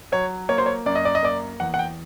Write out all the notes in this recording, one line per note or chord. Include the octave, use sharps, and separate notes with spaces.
F#3 C#5
A#3 C#5
C5
C#5
F#2 D5
D#5
D5
D#5
A#3 D5
E2 F#5
F#5
G5